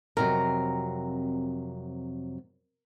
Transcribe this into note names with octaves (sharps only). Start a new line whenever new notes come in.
F2 C3 F#3 A#4